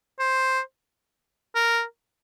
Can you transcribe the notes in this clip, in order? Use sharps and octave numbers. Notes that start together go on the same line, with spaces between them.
C5
A#4